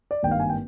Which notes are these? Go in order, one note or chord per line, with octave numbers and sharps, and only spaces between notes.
D5
G#1 G2 D#3 A#3 G5
F5
G#5
G5